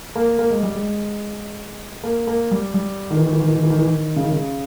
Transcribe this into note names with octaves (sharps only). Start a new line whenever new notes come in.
A#3
A#3
G#3
G3
G#3
A#3
A#3
G3
G3
D#3
E3
D#3
E3
D#3
E3
D#3
E3
D#3
E3
D#3
C#3
D#3
C#3